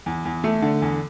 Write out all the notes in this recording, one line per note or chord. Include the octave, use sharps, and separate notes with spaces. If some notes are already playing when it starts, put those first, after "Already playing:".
E2
E2
A3
D3
E2